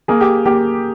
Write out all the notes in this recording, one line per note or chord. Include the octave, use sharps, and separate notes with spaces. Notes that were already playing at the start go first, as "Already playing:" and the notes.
A#3 G#4
G4
A#3 G4